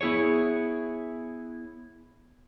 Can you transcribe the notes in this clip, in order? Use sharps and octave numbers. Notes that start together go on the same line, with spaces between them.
B3 E4 G#4 C#5